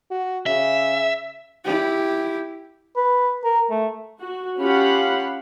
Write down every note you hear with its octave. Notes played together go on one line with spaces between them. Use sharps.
F#4
C#3 E5
E4 G4
B4
A#4
A3
F#4
C#4 F4 G4 F5 F#5 B5